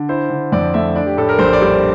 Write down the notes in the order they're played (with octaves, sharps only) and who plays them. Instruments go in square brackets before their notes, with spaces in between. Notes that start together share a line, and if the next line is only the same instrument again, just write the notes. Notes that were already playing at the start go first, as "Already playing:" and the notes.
Already playing: [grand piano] D3
E4 C5
D3
F2 D5
A3 E5
D4 D5
G4
A2 A4
A#4
A#1 C5
D5
G3 C5